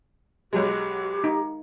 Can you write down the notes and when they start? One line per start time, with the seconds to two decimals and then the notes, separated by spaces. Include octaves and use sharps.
0.53 B1 F#3 G#3 G4
1.24 D#4